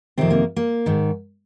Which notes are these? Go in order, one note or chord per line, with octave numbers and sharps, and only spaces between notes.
F2 C3 D#3 C4
A#3
A#3
G#2 D#3